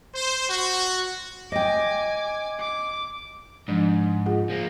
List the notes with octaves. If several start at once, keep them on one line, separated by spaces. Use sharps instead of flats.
C5
F#4
D#5 G5 G#5 D6
D6
G#2 F3 D4
F4 G#4 F#5
F3 A#3